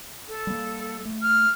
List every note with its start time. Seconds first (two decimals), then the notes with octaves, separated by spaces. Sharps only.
0.28 A4
0.47 G3 A#3
1.05 A3
1.22 F6